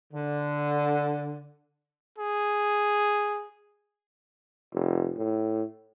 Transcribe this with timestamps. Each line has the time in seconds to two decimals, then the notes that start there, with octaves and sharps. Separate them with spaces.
0.13 D3
2.18 G#4
4.73 F1
5.17 A2